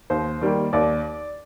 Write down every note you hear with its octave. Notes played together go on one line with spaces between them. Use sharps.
D#2 C5
D#3 G3 A#3
D#2 D5